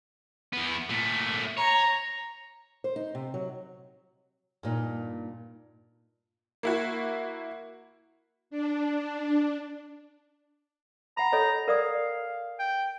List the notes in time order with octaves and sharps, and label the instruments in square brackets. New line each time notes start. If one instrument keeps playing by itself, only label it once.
[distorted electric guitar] E2 B3
A#2 A3
[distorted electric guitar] C#5 [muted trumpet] A#5
[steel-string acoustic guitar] C5
D#4
C3
F#3
[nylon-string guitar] G2 A#2 D#4
[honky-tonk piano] A#3 E4 F#4
[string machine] D4
[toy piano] F#5 B5 [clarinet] A#5
[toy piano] A4 C#5 D#5
[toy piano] A#4 D5 D#6 [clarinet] F5
[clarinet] G5